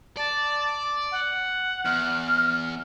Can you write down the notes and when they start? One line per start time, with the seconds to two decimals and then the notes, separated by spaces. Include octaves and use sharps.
0.17 D5 A5
1.12 F#5
1.85 E2 F6